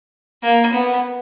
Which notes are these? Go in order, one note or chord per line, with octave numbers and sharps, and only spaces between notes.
A#3
B3